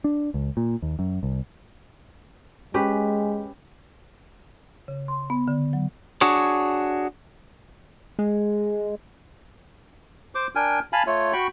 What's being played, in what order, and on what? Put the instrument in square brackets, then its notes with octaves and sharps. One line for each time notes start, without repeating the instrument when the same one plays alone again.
[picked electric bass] D4
C#2
A#2
D#2
F#2
C2
[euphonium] G#3 [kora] C#4 G4 B4
[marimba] C#3
C6
B3
D3
F#3
[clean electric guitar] D4 F#4 G#4 C#5
[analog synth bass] G#3
[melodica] C5 D6
D4 A#4 G5 G#5
F5 G#5 A5 B5
A3 F4 C#5
F#4 G5 B5 C#6